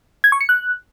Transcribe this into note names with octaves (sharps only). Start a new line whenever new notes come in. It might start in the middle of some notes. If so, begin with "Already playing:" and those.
G#6
C#6
C#7
F#6